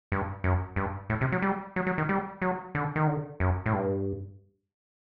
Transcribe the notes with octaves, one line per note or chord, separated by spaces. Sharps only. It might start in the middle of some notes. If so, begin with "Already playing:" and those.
G2
F#2
G2
A2
C3
F#3
G3
F#3
F#3
D#3
G3
F#3
D3
D#3
D3
F#2
A2
G2